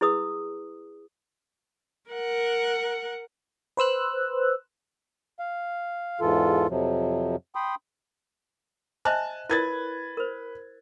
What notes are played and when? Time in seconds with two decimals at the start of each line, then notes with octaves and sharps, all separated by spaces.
0.01 E4 G#4 B4 D#6 E6
2.10 A#4 F#5
3.77 B4 C5 E6 F#6
5.39 F5
6.21 E2 G#2 E3 F4 A4
6.70 F2 C3 F3 F#3
7.55 G5 B5 C6 D#6
9.05 C5 D#5 E5 G#5 A5 F#6
9.49 E4 A#4 B4 C#5 G#6 A6
10.17 A#4 C5